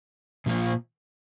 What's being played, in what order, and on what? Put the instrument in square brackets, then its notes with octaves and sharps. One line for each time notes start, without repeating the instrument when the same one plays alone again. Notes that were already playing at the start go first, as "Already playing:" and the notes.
[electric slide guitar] A#2 F3 A#3 F4